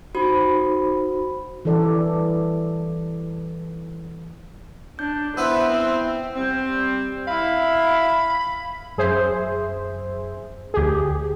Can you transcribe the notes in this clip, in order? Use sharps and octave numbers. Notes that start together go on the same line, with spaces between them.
D#4 F#4 C5 B5
E3 G3 A4 D5
D4 G6
B3 E4 B4 C5 E5 E6
C4
G3 C4
E4 F5 B5
F#2 G#4 C5 E5
D2 G4 G#4